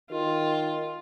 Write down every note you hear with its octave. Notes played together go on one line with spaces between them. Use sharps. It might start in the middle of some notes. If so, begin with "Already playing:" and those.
D#3 F4